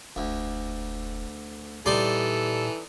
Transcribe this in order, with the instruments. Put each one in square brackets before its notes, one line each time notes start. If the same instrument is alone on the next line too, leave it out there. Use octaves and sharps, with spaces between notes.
[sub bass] E1 [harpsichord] D2
[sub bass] A#2 [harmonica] E3 A4 [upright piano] G3 [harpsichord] D#4 D5 C6